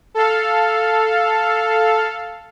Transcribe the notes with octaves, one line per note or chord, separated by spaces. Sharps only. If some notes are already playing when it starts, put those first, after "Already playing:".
A4 F5